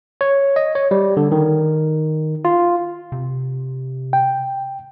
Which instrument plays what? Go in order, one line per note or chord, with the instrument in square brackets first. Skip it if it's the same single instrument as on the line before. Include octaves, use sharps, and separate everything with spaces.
[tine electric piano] C#5
D#5
C#5
G3
D3
D#3
F4
[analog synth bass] C3
[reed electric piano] G5